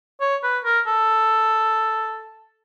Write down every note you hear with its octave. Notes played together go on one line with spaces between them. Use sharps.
C#5
B4
A#4
A4